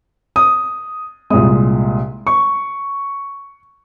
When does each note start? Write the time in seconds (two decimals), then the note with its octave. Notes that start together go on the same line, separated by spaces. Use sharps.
0.36 D#6
1.30 C2 A#2 G#3 D#6
2.27 C#6